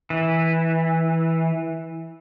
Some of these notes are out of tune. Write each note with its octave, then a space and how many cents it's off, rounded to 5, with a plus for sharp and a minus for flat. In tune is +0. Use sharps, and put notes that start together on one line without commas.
E3 -10